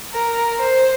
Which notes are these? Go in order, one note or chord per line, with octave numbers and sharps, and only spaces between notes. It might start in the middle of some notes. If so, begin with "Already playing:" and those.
A#4
C5